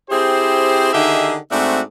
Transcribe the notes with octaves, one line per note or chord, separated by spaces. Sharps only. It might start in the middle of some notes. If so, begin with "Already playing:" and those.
C4 E4 G4 G#4 C5
D3 D#3 D#4 G4 G#4 E5
G#2 A3 C4 D4 F#4 E5